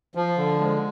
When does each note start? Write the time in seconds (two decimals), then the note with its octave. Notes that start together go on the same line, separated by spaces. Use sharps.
0.15 F3
0.38 D3
0.59 G#3